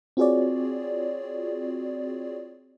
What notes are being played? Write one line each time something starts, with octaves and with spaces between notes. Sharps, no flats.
C4 F4 F#4 G#4 C#5 D5